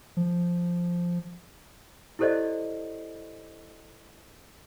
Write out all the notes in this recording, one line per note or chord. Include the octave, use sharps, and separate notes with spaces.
F3
E4 G4 A4 C5 D5 D#5